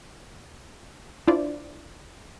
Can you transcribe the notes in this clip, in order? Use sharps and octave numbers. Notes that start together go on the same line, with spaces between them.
D4 E4 F4 C5 D5